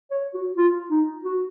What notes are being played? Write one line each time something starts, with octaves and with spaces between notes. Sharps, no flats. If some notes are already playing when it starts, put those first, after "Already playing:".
C#5
F#4
F4
D#4
F#4